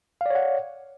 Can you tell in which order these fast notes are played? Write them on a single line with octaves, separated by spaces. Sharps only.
F5 D5 C#5 F#5